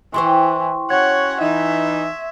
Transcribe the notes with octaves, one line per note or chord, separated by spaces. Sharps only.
E3 E4 G4 C5 C6 C#6
C#4 F#4 C#5 F#5 G#6
E3 D#4 E5